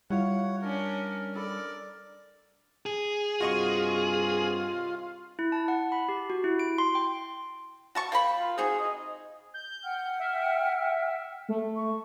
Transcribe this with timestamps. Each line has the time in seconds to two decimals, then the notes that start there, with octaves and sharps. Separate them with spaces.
0.10 G3 E4 F4 C#5 F5 F#5
0.62 C#4 D4 A#4
1.35 A4 D5 B5
2.86 G#4
3.40 G2 C3 C4 F4 F#4 D#5 C#6
5.39 E4
5.52 A5
5.68 F#5
5.92 B5
6.09 G4
6.30 F#4
6.44 E4
6.59 D7
6.78 C6
6.95 G5
7.95 F#4 A5 C#6
8.12 A#3 G5 B5
8.39 F4
8.58 C4 D#4 F#4 G#4
8.80 D#5
9.54 G6
9.84 F#5 G5 F6
10.19 E5
11.49 A3
11.76 C#6